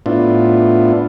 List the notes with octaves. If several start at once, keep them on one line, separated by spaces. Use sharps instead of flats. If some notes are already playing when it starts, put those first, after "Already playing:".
A2 B3 D4 E4 F4